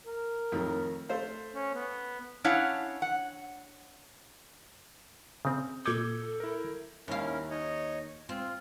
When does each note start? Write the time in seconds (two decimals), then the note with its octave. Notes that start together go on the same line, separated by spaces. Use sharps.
0.07 A#4
0.52 F2 A2 D#3
1.09 A3 C5 F5
1.55 C#4
1.74 B3
2.44 C#4 D4 E4 C#5 F5 F#5
3.02 F#5
5.45 C#3 C4
5.86 A#2 A4 D6 G6 G#6
6.40 E4 A#4
7.08 D#2 C#4 E4 A#4 F5
7.50 D#4 C#5 D#5
8.29 C4 F4